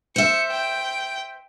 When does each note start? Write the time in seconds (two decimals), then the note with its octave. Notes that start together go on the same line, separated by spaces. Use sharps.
0.16 C5 E5 C#7
0.51 G5